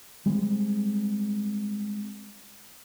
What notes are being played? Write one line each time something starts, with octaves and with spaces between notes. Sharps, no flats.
G3 G#3 C4